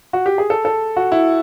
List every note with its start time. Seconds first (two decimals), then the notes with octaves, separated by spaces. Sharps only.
0.13 F#4
0.26 G4
0.38 G#4
0.50 A4
0.65 A4
0.97 F#4
1.12 E4